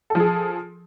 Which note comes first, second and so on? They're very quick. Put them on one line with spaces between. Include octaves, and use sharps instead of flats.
A4 F3 G#4